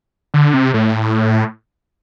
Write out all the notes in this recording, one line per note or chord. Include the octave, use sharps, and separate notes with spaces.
D3
C3
A2